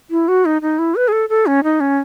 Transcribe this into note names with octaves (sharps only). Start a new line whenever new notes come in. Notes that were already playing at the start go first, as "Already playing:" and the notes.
E4
F#4
D#4
D#4
E4
B4
G#4
A4
A4
C#4
D#4
C#4